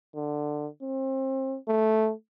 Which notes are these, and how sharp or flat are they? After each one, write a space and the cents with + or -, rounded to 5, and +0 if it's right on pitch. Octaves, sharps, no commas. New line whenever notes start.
D3 +15
C4 +30
A3 -10